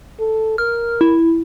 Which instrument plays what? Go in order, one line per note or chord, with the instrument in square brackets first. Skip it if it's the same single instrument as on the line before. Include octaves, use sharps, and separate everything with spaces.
[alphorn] A4
[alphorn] A#4 [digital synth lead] F6
[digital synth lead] E4